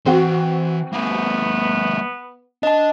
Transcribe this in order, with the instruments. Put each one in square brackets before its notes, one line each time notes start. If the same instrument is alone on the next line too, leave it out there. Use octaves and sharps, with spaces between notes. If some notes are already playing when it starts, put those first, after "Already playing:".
[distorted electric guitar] E3 C6 [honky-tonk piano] C4 F#4
[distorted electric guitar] G#3 A#3 [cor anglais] B3
[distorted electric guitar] D4 [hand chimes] D#5 A5